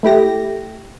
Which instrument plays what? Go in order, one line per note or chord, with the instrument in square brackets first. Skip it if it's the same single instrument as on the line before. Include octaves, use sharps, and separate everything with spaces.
[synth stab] A3 E4 G4 A#6